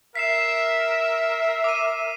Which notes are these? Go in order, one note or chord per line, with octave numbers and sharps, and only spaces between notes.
A#4 E5 B6 C7 E7
D6 D#7